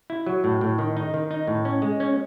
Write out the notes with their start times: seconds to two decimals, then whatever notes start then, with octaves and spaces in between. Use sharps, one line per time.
0.10 E4
0.26 F#3
0.44 A2
0.61 A2
0.78 D#3
0.97 D#4
1.14 D#3
1.31 D#4
1.47 A2
1.65 C#4
1.82 G#3
2.00 C#4